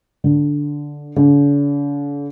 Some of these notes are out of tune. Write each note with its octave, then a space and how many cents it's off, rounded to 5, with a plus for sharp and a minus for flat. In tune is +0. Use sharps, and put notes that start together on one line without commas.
D3 -5
D3 -45